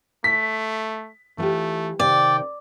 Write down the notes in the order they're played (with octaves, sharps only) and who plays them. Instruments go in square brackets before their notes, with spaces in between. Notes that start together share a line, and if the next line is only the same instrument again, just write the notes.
[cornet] A3 [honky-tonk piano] B6
[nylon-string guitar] E3 F4 G4 [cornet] A3
[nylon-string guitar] C3 D#3 F5 [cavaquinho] D5 [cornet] G5